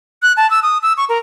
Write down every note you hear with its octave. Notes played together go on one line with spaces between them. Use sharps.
F#6
A5
E6
D#6
E6
C#6
A#4